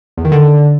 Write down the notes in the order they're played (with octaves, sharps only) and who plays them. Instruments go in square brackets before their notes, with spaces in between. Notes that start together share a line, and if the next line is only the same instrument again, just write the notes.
[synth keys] E2
D#3
D3